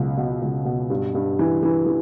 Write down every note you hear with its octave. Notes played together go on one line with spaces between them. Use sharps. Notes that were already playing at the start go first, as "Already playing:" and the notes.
Already playing: C#2 B2 F#3
B2
C#2
B2
G2
G2
E3
E3
E3